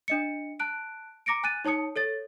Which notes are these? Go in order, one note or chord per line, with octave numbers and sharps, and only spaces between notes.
D4 D#5 C#7
A5 F#6 D7
A#5 D6 A#6 C#7 D7
G#5 F#6 A6 D#7
D#4 C#5 A5 D#6 C#7
A4 C#5 A6